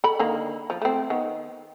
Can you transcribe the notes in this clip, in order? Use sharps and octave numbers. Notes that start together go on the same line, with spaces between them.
A4 B5
D3 D#3 A#3
F3
A3 C4
D#3 B3